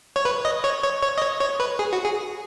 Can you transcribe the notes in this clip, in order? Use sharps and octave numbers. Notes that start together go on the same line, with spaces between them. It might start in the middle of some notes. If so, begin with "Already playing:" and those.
C#5
B4
D#5
C#5
C#5
C#5
D#5
C#5
C#5
B4
G#4
F#4
G#4